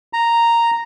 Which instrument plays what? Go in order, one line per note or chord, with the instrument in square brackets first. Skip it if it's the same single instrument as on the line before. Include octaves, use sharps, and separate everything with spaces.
[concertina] A#5